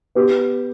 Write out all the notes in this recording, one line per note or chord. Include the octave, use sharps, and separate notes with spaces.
B3 G4